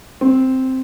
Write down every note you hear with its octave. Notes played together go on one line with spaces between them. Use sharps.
C4